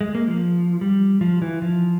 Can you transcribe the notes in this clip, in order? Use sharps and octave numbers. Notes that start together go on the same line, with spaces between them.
G#3
A#3
F3
G3
F3
E3
F3